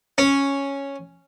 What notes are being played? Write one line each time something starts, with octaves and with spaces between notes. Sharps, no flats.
C#4